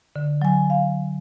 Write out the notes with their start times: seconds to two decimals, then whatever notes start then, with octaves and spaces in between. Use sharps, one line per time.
0.16 D3
0.42 F#3 G#5
0.70 F5